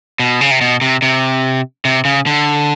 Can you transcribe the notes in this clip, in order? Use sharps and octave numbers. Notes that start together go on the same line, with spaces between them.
B2
C#3
C3
B2
C3
C3
C3
C#3
D3